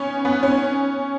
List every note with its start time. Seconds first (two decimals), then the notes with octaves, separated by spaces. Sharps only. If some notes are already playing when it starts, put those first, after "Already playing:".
Already playing: B3 C#4
0.25 B3
0.43 C#4